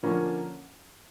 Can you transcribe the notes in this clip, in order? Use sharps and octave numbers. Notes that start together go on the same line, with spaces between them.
D3 F3 A#3 C#4